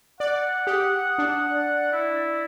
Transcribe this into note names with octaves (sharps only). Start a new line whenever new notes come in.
D5 F#5
G4 D#6
D4
D5
E4